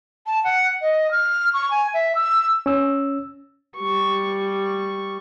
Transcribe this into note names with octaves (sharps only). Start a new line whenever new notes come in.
A5
F#5
D#5
F6
C#6
G#5
E5
E6
C#4 E6
G3 C#6